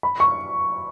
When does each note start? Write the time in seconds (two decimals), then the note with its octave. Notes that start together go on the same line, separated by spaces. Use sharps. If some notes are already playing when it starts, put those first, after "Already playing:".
0.03 B5
0.20 C#6